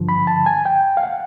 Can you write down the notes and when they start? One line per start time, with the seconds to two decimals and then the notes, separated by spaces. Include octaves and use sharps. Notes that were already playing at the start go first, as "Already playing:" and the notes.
Already playing: G2 D3 F3
0.09 B5
0.27 A5
0.46 G#5
0.65 G5
0.97 F5
1.03 F#5